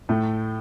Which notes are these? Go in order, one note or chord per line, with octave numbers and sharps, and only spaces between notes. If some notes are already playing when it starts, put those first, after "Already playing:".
A2 A3